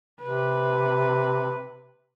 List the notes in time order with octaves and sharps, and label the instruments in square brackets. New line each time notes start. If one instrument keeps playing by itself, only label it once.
[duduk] C3 [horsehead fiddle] B4